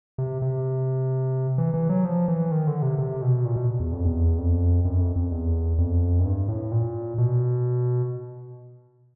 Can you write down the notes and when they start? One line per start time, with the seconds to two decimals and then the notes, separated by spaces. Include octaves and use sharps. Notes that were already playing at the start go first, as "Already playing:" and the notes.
0.18 C3
0.42 C3
1.58 E3
1.74 E3
1.89 F#3
2.05 F3
2.28 E3
2.52 D#3
2.67 D3
2.82 C3
2.98 C3
3.22 B2
3.45 A#2
3.56 B2
3.80 E2
3.93 F2
4.05 E2
4.38 F2
4.85 F#2
5.01 F2
5.16 F2
5.32 E2
5.78 F2
6.19 F#2
6.25 G2
6.48 A2
6.72 A#2
7.18 B2